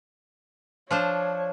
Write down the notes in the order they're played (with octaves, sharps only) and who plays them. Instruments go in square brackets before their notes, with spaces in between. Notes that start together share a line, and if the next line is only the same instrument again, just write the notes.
[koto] F3 D4 C5 [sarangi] C#5